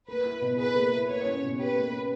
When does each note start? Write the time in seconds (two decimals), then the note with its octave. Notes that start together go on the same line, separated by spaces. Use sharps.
0.08 A#3 B4
0.25 E4
0.41 B2
0.58 G#4 B4
0.75 A#3
0.92 E4
1.08 A#3 C#5
1.25 C#4
1.43 B2
1.59 G4 B4
1.75 A#3
1.92 C#4